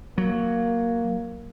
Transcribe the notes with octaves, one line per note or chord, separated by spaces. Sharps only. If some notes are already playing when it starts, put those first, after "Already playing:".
F#3 A#3